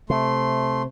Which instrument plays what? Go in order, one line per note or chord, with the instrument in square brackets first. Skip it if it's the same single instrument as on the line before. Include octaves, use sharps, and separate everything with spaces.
[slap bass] C3 [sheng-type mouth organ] A3 C6